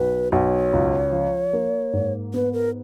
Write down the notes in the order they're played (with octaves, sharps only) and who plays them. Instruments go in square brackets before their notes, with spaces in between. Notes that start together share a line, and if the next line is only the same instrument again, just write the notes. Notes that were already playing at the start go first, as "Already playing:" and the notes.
Already playing: [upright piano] B1 [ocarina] B4
[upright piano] B1 [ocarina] C#5
[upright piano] C#2
F3
A#3
G#2
[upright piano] B3 [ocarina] B4
[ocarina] A#4